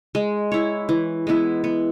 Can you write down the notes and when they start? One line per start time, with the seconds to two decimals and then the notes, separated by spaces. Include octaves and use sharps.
0.15 G#3
0.52 E4 C#5
0.89 E3
1.27 G#3 B3 E4
1.64 B3